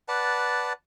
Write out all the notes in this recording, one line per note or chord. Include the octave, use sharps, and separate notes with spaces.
B4 D5 F#5 A5